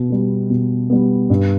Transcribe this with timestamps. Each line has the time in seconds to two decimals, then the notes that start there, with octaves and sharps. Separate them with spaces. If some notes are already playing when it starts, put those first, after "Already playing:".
Already playing: B2
0.10 G3 B3
0.50 B2
0.90 G3 B3
1.30 G2